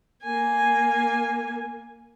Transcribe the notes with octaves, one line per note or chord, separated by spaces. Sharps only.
A#3 G#5